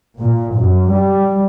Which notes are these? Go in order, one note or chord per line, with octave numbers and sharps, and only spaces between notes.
A#2
F#2
G3